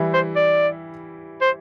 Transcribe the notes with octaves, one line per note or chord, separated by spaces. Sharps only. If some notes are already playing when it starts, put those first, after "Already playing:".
Already playing: E3 G3 E4
C5
D5
C5